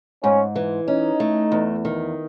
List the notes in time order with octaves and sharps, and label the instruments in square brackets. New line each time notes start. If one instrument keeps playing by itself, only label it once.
[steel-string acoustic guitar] G#2 [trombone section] C#4
[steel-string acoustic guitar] E3
[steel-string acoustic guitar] C#4 [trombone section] D#4
[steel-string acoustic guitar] A3
E2
D#3